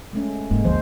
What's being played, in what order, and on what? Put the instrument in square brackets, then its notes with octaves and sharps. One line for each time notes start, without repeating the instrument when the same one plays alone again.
[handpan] G#3 A3 C#4
[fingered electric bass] F1 G#2 [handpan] G#3 A#3
[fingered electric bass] F#1 D2 F3 [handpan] C5